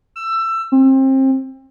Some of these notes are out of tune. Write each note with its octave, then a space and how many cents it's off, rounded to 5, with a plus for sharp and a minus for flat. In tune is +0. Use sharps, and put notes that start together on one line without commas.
E6 +20
C4 +30